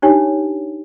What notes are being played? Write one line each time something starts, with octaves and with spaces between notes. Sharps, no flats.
D4 D#4 G4 C#5